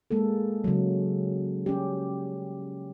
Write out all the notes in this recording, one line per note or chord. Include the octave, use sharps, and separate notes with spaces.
G#3 A#3 A4
C#3 F#3
C#4 G4